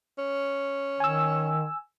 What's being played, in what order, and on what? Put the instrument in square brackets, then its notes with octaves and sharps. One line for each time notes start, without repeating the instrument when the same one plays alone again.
[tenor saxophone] C#4
[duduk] D#3 [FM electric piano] G#5 E6